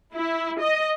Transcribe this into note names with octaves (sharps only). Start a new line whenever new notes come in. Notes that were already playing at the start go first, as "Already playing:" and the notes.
E4
D#5